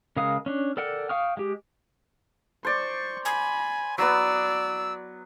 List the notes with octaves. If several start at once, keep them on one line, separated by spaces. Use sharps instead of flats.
C#3 G#3 A#4 F5 D#6
C#4 D4
A4 A#4 D5 F#5 G5
F5 G5 C#6 D#6 F6
G#3 G4
C5 D5 C#6
G#5 B5
F#3 B3 D5 E6